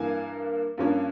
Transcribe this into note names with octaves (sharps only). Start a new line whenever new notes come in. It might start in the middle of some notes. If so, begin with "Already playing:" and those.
Already playing: G2 E3 A#3 G#5
G2 F3 A#3 C#4